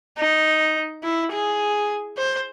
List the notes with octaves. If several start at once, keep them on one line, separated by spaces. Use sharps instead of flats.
D#4
E4
G#4
C5